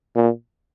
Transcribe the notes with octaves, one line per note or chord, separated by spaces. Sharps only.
A#2